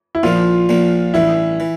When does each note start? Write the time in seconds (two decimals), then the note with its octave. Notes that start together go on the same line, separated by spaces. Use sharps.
0.15 E4
0.23 A#1 A#2 F3 A#3 F4
0.69 A#1 A#2 F3 A#3
1.14 A1 G2 E3 E4
1.60 E3